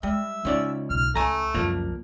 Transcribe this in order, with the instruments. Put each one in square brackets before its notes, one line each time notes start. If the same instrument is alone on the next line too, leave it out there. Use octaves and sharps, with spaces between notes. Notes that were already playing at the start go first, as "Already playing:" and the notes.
[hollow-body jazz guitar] G3 [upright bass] G#3 [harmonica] E5
[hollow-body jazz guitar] C#2 C#4 D5 [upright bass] D#4
[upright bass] B1 [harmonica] F6
[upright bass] C#2 [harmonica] A3 [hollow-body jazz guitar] G#5 A#5
[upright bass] F#1 C#2 [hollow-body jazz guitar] F3 A#3 A#4